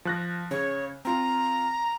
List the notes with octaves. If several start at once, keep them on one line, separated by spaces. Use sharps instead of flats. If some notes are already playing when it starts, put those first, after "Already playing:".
F3 F#6 A#6
C#3 C#5
C4 F4 A#5